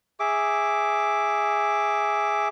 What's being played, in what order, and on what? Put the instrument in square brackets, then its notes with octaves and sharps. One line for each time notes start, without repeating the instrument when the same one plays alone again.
[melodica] G#4 E5 D6